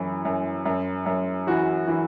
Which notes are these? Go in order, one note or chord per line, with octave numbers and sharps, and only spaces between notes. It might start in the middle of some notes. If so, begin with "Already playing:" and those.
Already playing: F#2 E3
F#2
F#2
F#2
E3 F#4
E3